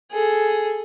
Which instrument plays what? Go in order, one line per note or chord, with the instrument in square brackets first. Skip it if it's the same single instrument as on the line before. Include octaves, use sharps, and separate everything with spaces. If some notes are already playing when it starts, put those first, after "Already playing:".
[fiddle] G#4 A4